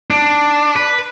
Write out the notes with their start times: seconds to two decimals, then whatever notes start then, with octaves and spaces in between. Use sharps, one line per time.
0.10 D4
0.76 B4